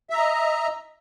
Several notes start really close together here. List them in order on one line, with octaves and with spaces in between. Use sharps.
E5 A#5 D#5